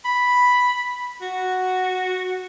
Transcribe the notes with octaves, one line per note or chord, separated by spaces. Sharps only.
B5
F#4